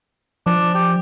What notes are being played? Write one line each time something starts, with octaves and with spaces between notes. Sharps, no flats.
F3 D4
G4